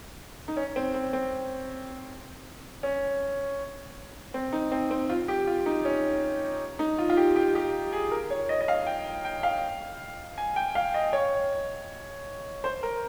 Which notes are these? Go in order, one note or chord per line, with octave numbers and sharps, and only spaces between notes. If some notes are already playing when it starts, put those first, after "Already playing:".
D#4
C#4
C4
C4
C4
C#4
C4
D#4
C4
C4
F4
G4
F4
D#4
C#4
D#4
F4
F4
G4
G4
G4
G#4
A#4
C#5
D#5
D#5
F5
G5
G5
F5
G#5
G5
F5
D#5
C#5
C5
A#4